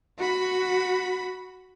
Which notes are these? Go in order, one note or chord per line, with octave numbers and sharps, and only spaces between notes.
F#4 B5